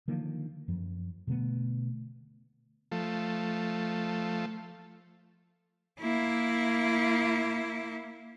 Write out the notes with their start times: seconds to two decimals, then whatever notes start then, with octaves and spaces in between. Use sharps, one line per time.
0.08 D3 D#3 F3 A#3
0.68 F#2 F3
1.27 B2 D3 A3 B3
2.92 F3 A3
6.00 A#3 E4